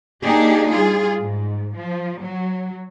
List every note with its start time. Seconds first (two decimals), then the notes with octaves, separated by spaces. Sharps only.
0.23 A#3 D4 D#4 G4 G#4
0.71 G3 F4 G#4
1.21 G#2
1.76 F3
2.23 F#3